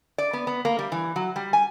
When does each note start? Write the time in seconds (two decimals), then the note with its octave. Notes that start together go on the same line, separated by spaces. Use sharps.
0.18 D5
0.33 B3
0.47 B3
0.65 A#3
0.79 G3
0.92 E3
1.16 F#3
1.36 G3
1.53 G#5